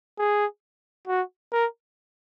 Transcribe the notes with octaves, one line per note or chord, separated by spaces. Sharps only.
G#4
F#4
A#4